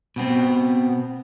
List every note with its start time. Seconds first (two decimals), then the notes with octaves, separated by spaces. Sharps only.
0.16 B2 B3 C4